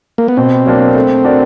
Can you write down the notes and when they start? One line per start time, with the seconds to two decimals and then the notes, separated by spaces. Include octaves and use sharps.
0.18 A#3
0.28 B3
0.37 B2 C4
0.66 F#3 A#3 D4
0.95 A3
1.25 D4 F#4 A#4 D5